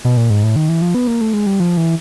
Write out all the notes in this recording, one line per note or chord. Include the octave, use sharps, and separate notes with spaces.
B2
A#2
G#2
A2
D#3
E3
F3
B3
A#3
A3
G#3
G3
F3
E3